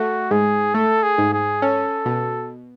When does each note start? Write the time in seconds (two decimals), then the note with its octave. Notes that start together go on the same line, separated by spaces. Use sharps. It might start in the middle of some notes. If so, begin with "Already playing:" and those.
Already playing: A3 F#4
0.31 G#2 G#4
0.74 A3 A4
1.03 G#4
1.18 G#2
1.33 G#4
1.62 C#4 A4
2.06 B2